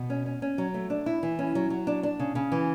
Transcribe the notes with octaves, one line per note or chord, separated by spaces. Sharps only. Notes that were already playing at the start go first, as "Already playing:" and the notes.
Already playing: B2
C#4
C#4
C#4
F#3
A3
D4
E4
E3
C#4
F#3
F#3
D4
D4
C#3
C#3
E3